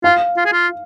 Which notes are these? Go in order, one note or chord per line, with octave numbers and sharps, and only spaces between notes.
F4 F5
F4
G#4
F4